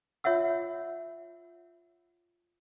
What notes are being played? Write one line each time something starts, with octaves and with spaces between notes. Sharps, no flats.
F4 C#5 E5 F#5 E6